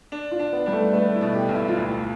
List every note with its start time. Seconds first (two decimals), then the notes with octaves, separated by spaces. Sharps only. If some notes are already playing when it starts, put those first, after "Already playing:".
0.12 D4
0.31 F4
0.39 D4
0.53 B3
0.66 G3 D4
0.73 A3
0.93 A3 B3
1.15 E4
1.21 B2
1.35 G4
1.49 B1
1.56 E4
1.69 F4
1.77 D2 E4